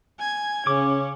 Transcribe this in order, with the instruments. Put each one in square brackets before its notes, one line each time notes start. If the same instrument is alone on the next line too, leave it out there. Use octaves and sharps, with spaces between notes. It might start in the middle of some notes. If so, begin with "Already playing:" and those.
[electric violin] G#5 G#6
[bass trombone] C#3 [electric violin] C#4 [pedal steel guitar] D6